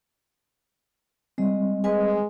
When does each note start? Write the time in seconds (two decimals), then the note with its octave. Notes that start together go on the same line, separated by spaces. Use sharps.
1.38 G3 G#3 C4 D#5
1.84 G#3 B4 D#5 G#5